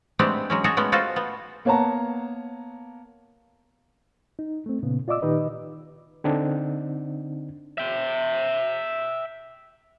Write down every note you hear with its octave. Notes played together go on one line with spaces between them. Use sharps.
G#3 A3 B3 C4 D4 G4
F#3 G#3 C#4
F#4 G#4 A4 C#5 D#5
G#3 A3 B3 C#4
F4 F#4 A4 C5 F5
B3
A#3 B3 C#5 F#5 A5 A#5
D#4
A3 C4
A#2 C#3 B3
F4 D5 D#5 D6 E6
A#2 D#3 D#4 G4 B4 D#5
D3 C4 D4 D#4
E5 G5